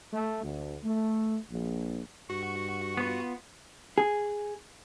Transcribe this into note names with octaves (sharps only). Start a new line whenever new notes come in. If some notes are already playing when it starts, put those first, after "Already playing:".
A3
D2
A3
A#1
G2 F#4 C#6
B3 F4
G#4